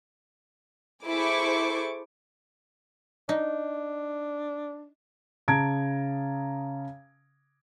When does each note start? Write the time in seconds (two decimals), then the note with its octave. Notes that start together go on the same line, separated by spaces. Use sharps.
1.06 E4 G#4 A4 C5 C#6 D6
3.29 D4 D#4
5.48 C#3 A5 A#5 G#6 D7